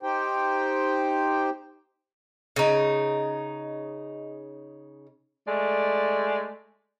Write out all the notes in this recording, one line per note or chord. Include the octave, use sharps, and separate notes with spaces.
D#4 G4 C5 G5
C#3 D#4
G#3 A3 D5